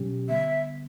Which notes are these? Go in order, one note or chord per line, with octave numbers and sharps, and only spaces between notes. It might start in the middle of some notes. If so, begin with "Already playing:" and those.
Already playing: B2 F#3 C#4 G4
D3 G3 B3 E5